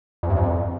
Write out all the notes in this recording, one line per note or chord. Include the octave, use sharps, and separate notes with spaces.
F2
G2
F2